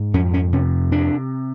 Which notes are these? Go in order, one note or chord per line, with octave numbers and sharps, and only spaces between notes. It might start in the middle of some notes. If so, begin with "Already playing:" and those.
Already playing: G#2
F2 C#4
C#4
C3 C#4
C3 D4